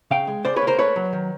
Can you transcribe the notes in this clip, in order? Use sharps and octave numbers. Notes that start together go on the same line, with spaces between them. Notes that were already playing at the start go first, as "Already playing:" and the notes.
C#3 F5 G5
G#3
C#3 C5 D5
B4 C#5
A#3
A#4 C5
A3 B4 C#5
F#3
D#3